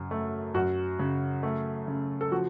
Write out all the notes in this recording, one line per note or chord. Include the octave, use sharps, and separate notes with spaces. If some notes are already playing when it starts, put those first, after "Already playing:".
Already playing: F#2 C#3
A3
F#2 F#4
C#3
A3
C#3
A4
F3 F#4